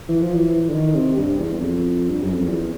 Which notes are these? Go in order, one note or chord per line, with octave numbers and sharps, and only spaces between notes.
E3
F3
E3
D3
D#3
C3
G2
E2
F2
G2
F#2
F2
E2